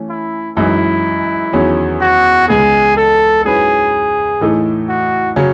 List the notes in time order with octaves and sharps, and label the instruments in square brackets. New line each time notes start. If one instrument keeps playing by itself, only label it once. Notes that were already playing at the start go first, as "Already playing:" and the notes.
Already playing: [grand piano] E3 A3 C#4
[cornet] E4
[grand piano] F#2 E3 G#3 D#4 [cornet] E4
[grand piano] E2 D#3 F#3 C#4 G#4
[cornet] F#4
[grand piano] C#2 C#3 G#3 B3 [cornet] G#4
[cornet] A4
[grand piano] G#2 F#3 C#4 E4 B4 [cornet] G#4
[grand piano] A2 E3 A3 D#4
[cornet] F#4
[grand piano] C#3 F#3 C#4